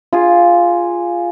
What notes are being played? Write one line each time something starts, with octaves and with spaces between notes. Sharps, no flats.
F4 G#4